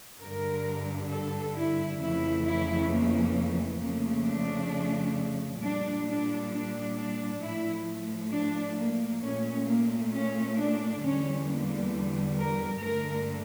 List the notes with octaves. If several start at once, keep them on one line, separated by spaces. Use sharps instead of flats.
G2 D3 G3 A#4
A4
E4
F2 C#3 E3 A3 E4
E4
A#3
F2 C#3 F3 A3 A#3
D4
A#2 G3 D4
D4
D4
D4
A2 F3 A3 E4
D4
A#3
A#2 A3 C#4
A#3
C#4
D4
E2 D3 G3 C#4
A#3
A#4
G2 D3 A3 A#4